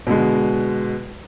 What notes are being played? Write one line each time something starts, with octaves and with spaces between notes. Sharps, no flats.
B2 D3 G#3